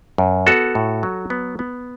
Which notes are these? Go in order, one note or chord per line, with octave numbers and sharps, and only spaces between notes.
F#2
B3 F#4 A4
A2
F#3
B3
B3